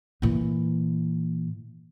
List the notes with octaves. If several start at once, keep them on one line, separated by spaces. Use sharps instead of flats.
A#2 E3